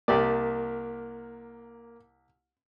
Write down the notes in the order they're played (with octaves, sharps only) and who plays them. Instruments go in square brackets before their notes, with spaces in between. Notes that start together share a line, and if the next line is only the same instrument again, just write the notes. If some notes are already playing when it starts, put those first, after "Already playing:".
[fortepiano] C2 G4 D5 [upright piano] A#3